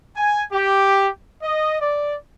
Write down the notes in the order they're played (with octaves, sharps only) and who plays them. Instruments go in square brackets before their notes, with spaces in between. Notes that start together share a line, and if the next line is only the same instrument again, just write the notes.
[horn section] G#5
G4
D#5
D5